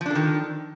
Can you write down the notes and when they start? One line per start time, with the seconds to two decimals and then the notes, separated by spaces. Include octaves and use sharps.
0.01 F3
0.06 D4
0.10 A4
0.15 D#3